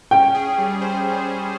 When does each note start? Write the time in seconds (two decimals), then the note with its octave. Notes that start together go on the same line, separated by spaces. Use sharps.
0.11 C#4 G5
0.34 G#4
0.58 G3
0.81 C5